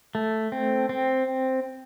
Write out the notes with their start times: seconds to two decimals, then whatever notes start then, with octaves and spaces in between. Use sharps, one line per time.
0.15 A3
0.52 C4
0.89 C4